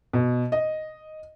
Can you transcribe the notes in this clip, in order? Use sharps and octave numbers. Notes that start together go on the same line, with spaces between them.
B2
D#5